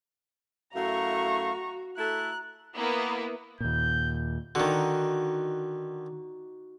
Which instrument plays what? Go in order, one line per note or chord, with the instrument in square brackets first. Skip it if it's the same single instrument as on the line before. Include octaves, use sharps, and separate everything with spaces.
[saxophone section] F#2 A3 E4 [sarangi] F#4 [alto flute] F5 [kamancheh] A#5 C#6
[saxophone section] A3 E4 A4 [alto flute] A#5 [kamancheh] F#6
[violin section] A#3 B3 E4
[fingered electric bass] D#2 A#2 [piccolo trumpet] G6
[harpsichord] D3 D#3 [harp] D#4 F#4